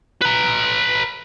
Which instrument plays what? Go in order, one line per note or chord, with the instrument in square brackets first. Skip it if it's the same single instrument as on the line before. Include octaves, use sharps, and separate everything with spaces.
[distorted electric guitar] B4 A#5